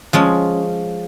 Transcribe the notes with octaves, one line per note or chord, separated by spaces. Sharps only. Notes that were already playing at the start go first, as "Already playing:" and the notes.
F3 G#3 C#4